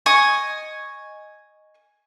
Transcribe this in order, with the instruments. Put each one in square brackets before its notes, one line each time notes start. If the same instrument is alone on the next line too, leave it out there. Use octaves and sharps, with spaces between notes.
[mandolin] D#5 G#5 C#6